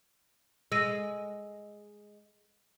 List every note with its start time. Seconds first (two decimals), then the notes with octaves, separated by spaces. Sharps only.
0.72 G#3 E6 A#6 D#7